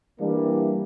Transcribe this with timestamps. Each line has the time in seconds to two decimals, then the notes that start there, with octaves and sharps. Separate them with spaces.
0.19 E3 G3 A#3 D4 E4